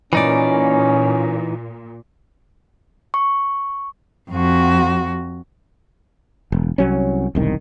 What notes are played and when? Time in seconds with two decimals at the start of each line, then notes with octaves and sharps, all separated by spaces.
0.13 A#2 E3 C#4 D#4 D5
3.14 C#6
4.31 F2 F#4
6.52 E1
6.78 C2 F#3 C#4
7.35 E1 C2 D#3